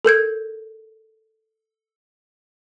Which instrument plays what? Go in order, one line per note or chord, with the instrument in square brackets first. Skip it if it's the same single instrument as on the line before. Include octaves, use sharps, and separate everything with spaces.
[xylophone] A4 A#4 G6 G#6